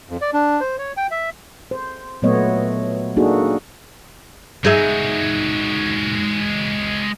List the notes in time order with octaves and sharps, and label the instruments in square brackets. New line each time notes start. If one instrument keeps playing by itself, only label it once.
[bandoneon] F2
D5
D4
C5
C#5
G5
E5
[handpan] C5
A#2 F#3 A3 B3 C#5 D#5
A#3 D4 D#4 F#4 G#4 A4
[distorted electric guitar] G#3 F#4 [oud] D#4 G#4 E5